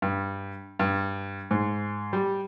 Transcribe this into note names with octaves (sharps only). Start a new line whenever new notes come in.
G2
G2
G#2
G3